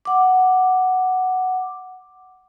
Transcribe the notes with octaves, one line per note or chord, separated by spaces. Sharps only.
F#5 D6